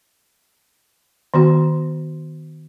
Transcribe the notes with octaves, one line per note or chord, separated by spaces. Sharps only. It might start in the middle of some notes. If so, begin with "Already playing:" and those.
D#3 B3 F#4